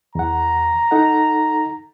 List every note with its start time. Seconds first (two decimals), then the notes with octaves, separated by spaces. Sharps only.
0.15 E2 F#5 A#5
0.91 D#4 A4 F#5